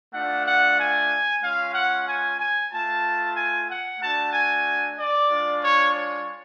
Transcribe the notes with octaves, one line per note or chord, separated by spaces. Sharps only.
A3 D4 F4 F#5
F#5
G#5
G#3 C#4 F4 F5
F#5
G#5
G#5
A3 F4 A5
G#5
F#5
A3 D4 F#4 A5
G#5
D5
G#3 D4 F4
C#5
C#5